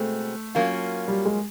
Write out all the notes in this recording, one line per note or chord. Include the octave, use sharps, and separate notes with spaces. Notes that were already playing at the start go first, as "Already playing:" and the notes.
Already playing: B2 G#3 A3 C4
F#3 A#3 C#4 F4
G3
G#3